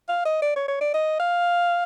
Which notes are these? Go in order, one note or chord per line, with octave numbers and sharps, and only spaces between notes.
F5
D#5
D5
C#5
C#5
D5
D#5
F5